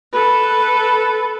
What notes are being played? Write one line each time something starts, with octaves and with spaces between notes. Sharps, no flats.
A4 B4